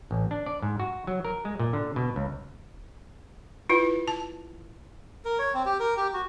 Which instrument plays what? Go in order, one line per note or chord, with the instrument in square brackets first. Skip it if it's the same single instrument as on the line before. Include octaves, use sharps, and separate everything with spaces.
[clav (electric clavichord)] A1
D4
D5
G#2
F#4
F#3
A#4
G#3
A#2
D3
B2
C#2
[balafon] E4 F4 B4
A5
[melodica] A#4
C#5
C4
G4
A#4
G4
F#4